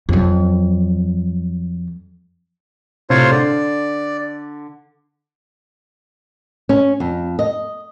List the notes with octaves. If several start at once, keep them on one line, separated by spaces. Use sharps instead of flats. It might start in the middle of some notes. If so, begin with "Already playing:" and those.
F2 F#3
A2 C3 F4 C5 C#5
D3 D5
C#4
F2
D#5